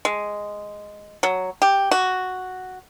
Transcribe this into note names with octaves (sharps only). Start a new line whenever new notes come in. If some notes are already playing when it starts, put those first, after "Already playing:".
G#3
F#3
G4
F#4